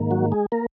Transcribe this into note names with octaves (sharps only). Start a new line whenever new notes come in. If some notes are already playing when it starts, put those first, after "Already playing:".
Already playing: G#2 D#3 A#3
F#3 F#4
G#3 G#4
A#3 A#4